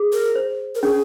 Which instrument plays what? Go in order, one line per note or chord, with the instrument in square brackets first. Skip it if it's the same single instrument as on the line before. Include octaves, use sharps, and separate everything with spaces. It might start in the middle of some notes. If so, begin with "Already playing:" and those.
Already playing: [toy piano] G#4
[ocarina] A#4
[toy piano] C5
[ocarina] A#4
[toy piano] C#4 [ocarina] G#4